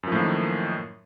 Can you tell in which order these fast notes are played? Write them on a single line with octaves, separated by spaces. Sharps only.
F#2 F3 A2 A#3 D#3